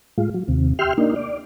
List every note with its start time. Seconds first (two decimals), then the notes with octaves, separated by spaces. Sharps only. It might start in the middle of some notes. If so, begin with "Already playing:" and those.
0.18 A2 G#3 F4
0.34 F#3
0.48 D#2 C3
0.79 G4 E5 G5 C6 F6
0.98 A#3 D4 D#4
1.16 D5